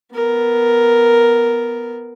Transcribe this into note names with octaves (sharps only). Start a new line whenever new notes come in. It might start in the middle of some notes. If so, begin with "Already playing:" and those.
B3 A#4